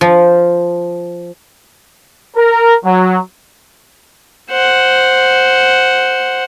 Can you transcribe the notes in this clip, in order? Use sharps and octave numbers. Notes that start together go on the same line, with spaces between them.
F3
A#4
F#3
C5 F#5